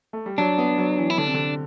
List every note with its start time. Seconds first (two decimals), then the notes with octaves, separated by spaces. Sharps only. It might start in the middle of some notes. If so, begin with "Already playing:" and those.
0.13 A3
0.26 G3
0.38 F#3 D4
0.58 B3
0.78 F#3
0.98 E3
1.10 E4
1.18 D3 D4
1.26 C3
1.34 D3